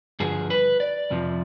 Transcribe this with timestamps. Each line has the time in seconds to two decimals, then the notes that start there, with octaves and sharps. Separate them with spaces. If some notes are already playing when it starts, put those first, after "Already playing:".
0.20 G2 D3 F3 G#4
0.50 B4
0.80 D5
1.10 F2 C3 F3